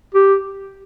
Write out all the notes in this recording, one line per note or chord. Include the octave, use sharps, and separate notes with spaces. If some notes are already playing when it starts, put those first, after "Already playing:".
G4